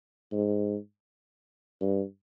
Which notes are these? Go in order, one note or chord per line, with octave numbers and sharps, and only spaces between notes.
G#2
G2